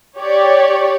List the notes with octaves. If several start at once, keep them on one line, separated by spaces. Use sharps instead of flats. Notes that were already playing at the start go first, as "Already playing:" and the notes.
G4 C#5 D5